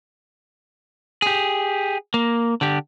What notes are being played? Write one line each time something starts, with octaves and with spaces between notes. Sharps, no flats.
G4 G#4
A#3
D3 G4